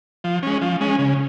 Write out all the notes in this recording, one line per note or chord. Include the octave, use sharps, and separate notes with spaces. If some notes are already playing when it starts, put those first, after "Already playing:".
F3
G#3 C#4
F3
G#3 C#4
C#3